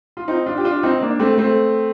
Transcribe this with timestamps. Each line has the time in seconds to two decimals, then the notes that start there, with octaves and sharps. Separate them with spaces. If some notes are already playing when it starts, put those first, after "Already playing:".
0.17 F4
0.28 C4 D#4
0.46 D4 F4
0.57 G4
0.64 D4 F4
0.83 C4 D#4
1.01 A#3 D4
1.19 A3 C4
1.38 A3 C4